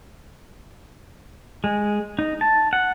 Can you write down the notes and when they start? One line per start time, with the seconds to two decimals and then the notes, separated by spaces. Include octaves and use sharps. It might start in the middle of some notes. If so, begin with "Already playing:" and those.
1.64 G#3
2.19 D#4
2.41 A5
2.73 F#5